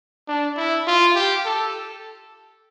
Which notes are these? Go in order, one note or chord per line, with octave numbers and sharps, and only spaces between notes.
D4
E4
F4
G4
A4